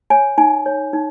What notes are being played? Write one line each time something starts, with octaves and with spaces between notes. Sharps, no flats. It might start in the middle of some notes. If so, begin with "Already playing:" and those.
C#5 G#5
D#4 G#5
C#5
D#4